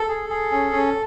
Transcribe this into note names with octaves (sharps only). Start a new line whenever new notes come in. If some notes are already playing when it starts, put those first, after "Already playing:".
Already playing: A4
G#4
G#4
C#4
C#4